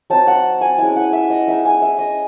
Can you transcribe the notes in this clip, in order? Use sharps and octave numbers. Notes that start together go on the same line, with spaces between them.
F#3 C4 D#4 A5
F#5
G#5
G#3 C#4 E4 G#5
F#5
E5
D#5
G#3 D#4 E5
G#5
E5
D#5